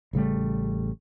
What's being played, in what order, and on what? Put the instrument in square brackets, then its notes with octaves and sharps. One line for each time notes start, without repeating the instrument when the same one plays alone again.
[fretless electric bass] A1 C#3 G3 A3